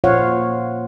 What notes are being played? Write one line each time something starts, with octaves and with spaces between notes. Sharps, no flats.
A#2 F4 C5 C#5 F5 F#5